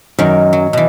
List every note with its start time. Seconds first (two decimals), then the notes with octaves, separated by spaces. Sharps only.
0.19 F#2 D#3 A#4
0.53 F#3
0.73 B2 E3